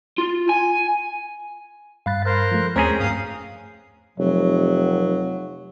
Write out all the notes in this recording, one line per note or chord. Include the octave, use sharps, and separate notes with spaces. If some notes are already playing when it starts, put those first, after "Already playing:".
F4
G#5
G2 F5 B5 F#6 A6
A#4 C5 F#6
F3 A3
D#2 A3 C4 C#4 G#4 G5 A#5 G6
G2 F5 D#6
F1 F#3